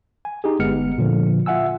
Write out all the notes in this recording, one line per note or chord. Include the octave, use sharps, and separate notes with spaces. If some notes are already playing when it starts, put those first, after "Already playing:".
G#5
D#4 G4 G#4
G1 G#3 B3 F6 C#7
A#2 D3 F3
F4 E5 F#5 G#5 E6